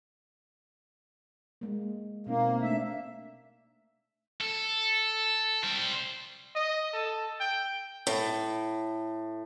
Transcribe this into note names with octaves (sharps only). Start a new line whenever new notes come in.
G#3 A#3
B2 A#3 C4 D#4
A3 D4 E5
A4
G3 C5
D#5
A4
G5
A2